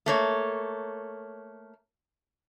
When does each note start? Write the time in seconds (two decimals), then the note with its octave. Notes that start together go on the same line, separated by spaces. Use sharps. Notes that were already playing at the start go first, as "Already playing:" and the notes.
0.06 A3 A#3 C#5